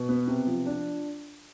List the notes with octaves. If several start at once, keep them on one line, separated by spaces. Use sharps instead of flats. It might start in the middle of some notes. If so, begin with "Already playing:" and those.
Already playing: B2
B3
C3
F3
D4